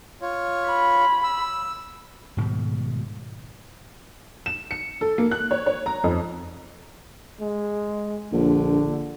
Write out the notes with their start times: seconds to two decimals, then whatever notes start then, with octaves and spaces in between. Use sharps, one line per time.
0.22 F4 C#5
0.68 B5
1.24 E6
2.37 G#2 B2 D#3 G3
4.46 E7
4.71 C#7
5.01 A4
5.18 A#3
5.31 F#6
5.51 C#5
5.66 C#5
5.86 A#5
6.04 F2
7.40 G#3
8.32 A#1 D3